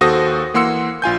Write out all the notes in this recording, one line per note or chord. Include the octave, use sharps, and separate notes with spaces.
D#2 F#4 A4 C5 D#6 A#6
E3 A#3 F#5 C6 E6 C#7
A#1 F4 G#5 G6